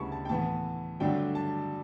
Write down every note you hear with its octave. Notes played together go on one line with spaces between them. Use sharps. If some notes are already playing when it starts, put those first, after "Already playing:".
Already playing: D2 C#3 G3 B3 E4 A5 B5 C#6
A5
G5
A2 E3 B3 A5
G2 D3 F#3 A3 D4 G5
A5